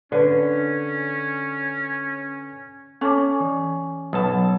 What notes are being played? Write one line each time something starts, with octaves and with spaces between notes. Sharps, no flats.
D3 C#4 B4
C#4 A4 A5 D6
E3
B1 F#3 B4 F#5 A5